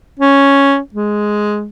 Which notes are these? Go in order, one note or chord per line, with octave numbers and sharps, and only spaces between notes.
C#4
G#3